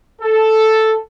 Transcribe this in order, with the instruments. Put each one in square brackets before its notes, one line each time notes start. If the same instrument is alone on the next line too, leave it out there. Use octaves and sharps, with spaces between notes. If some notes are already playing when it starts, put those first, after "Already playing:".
[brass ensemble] A4